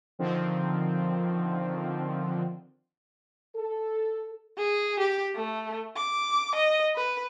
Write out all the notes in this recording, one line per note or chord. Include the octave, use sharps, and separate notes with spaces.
D3 D#3 F3 C4
A4
G#4
G4
A3
D6
D#5
B4